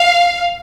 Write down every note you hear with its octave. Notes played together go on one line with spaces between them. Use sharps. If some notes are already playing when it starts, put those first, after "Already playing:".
Already playing: F5